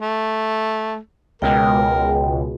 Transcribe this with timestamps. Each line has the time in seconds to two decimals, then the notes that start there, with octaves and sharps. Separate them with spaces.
0.01 A3
1.42 C#2 B2 G#3 A#4 G5